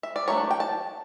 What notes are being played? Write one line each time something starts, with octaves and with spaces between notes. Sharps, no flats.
E5
D5
F#3 A3 D4 C#5
G5
A5